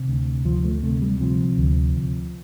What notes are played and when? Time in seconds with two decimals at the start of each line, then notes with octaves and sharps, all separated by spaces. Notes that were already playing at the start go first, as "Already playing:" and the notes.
Already playing: C3
0.08 D2
0.45 D2 F3
0.65 A3
0.83 C3 A3
1.02 G3
1.20 C3 F3
1.58 D2